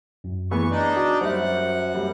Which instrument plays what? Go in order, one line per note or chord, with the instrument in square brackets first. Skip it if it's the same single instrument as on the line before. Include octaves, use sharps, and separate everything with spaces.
[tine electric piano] F#2
[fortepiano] E3 B3 G#4 [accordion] C#6
[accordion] D4 D#4 D5
[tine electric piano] F#4
[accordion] F#2 F#5 [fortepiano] G3 [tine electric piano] C5 E5
[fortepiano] G3